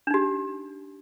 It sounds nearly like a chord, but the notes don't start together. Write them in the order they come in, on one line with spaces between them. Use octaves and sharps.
D4 D#4 G4